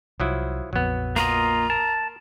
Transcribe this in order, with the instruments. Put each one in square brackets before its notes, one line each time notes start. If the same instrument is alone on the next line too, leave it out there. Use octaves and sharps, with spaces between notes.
[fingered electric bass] C2 [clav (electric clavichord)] F3 F#3 E4
[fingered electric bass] A#1 F2 [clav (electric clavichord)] F#3 B3
[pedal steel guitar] A#3 F4 D#5 [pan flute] A#5
[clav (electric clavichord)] A#4 [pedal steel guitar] A5